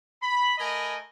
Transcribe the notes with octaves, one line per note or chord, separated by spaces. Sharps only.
B5
A3 A#4 D#5 G#5 B5